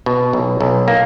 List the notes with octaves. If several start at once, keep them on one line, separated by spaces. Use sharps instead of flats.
B2
B1
B1
A#3